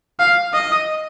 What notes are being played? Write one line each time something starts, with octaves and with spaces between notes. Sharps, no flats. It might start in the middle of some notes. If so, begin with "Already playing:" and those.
F5
D#5